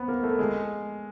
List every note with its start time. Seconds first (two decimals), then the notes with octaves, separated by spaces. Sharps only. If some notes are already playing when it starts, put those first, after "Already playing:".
Already playing: B3 C4
0.08 A#3
0.23 A3
0.39 G#3